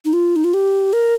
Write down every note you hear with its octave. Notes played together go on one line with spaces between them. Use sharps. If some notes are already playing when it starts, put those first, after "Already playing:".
D#4
F4
D#4
F4
G4
A#4